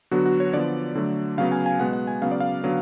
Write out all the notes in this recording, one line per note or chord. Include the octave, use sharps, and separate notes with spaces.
D3 F#3 B3 F#4
F#4
C#5
D3 F3 B3 D5
D3 F#3 A3
C#3 F#3 B3 F5
G#5
G#5
B2 G#3 B3 F#5
F#5
G#5
C#3 F#3 B3 F5
D5
F5
D3 F#3 B3